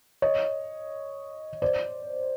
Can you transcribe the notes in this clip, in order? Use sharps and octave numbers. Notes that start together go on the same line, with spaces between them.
C#5 D#5
C5 D5